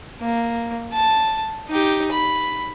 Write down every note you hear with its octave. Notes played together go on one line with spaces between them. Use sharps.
A#3
A5
D#4 G4
B5